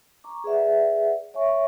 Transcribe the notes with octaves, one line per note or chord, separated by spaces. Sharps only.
A#5 C#6 D6
G#4 B4 D5 E5 F#5
C#5 E5 G#5 C#6